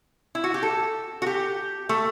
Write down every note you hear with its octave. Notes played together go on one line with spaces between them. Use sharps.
E4
F#4
G4
A4
F#4
G4
A3